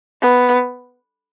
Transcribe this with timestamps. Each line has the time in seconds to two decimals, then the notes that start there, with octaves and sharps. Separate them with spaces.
0.22 B3